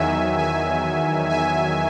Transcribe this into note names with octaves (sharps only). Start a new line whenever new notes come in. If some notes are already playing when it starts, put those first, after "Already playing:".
Already playing: E2 D#3 F#3 E5 G#5
E5 G#5
E5 G#5